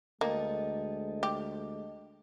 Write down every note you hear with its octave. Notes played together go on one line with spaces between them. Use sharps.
D2 G#3 A#3 D#5 G5 A5
G4